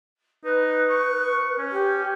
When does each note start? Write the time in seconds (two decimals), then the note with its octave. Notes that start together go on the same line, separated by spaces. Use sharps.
0.44 D#4 B4
0.90 C#6
1.58 C#4
1.72 G4